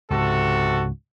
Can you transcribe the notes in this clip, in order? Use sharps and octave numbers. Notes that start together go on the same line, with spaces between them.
C#2 G#2 C3 F#4 A4